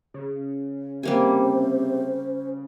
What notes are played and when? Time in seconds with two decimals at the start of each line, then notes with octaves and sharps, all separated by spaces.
0.14 C#3
1.03 C3 G3 A#3 C5 G#5